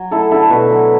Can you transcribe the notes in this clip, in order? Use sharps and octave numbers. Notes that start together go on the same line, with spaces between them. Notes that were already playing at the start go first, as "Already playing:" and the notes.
Already playing: F#3
A3 E4 A4
D3 E4 A4
B2 F#4 B4
F#3